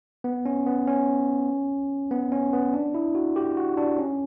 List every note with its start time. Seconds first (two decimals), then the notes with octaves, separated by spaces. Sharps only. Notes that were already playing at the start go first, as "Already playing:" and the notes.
0.24 B3
0.45 C#4
0.66 B3
0.87 C#4
2.11 B3
2.32 C#4
2.53 B3
2.73 D4
2.94 E4
3.15 F#4
3.36 G4
3.57 F#4
3.77 D4
3.98 C#4